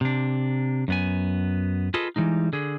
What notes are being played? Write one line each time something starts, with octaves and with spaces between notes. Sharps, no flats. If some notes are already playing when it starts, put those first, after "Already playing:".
C3 D4
F#2 B3 G#5
F4 G#4 A4 B4 D#5
E3 G3 G#3 D#4
D3 G#4